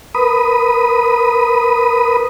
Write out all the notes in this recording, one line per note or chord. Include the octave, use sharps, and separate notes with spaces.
A#4 B4 B5 D#6